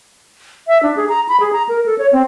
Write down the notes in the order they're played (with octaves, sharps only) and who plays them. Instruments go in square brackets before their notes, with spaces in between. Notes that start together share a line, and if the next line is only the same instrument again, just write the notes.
[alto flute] E5
D4
G#4
A#5
B5
G#4
A#5
A#4
A4
C#5
C4